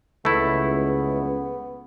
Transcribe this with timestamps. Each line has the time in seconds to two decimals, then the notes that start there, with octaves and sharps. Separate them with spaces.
0.25 C#2 A3 B3 E4